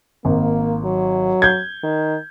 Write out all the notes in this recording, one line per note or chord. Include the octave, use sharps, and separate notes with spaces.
G#1 A#3
F#3
G6 G#6
D#3